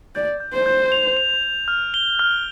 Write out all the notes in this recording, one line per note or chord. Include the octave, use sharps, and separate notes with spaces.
D5 G6
G6
C5
G6
F7
F7
F7
F6
G7
F6